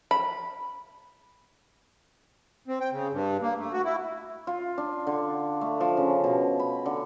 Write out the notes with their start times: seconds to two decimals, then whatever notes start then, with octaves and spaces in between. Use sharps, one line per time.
0.11 B5
2.68 C4
2.81 G5
2.92 C#3
3.12 G2
3.42 A#3
3.58 A3
3.73 F#4
3.85 E4
4.47 F4
4.78 D4
5.07 D3
5.61 A3
5.80 F3
5.97 C#3
6.24 B2
6.59 B5
6.86 D3